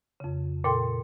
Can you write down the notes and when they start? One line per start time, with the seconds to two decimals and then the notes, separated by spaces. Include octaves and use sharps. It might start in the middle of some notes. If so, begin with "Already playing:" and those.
0.20 F2 C#3
0.64 A#2 A4 G5 C6